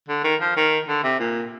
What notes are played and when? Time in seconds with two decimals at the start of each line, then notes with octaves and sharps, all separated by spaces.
0.09 D3
0.24 D#3
0.41 F3
0.56 D#3
0.88 D3
1.04 C3
1.20 A#2